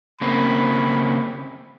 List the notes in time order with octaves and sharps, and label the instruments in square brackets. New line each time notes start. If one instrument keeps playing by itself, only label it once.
[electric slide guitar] C#3 A#3 C4 [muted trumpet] B5